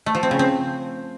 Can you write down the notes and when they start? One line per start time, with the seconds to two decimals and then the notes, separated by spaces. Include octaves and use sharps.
0.06 A3
0.15 F3
0.23 C4
0.31 C#3
0.39 C4